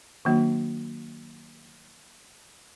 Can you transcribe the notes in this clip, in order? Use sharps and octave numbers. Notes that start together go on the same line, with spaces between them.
D#3 F#3 A#3 D4 F#4